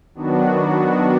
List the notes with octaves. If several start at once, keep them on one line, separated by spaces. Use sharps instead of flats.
D#3 F#3 B3 D4 F#4